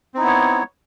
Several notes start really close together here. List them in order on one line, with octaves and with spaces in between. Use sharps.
C4 D#4 E4 B3 C#5